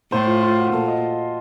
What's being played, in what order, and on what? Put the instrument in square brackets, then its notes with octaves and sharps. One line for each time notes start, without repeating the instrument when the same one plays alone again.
[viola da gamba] A2 [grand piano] C5
[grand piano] F4
F4
F#4
[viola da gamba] A#2 [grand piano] A4
[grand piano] D#5